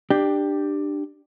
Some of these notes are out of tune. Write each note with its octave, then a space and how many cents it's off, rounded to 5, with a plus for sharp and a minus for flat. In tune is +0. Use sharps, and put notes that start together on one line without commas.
D4 +20 G4 +5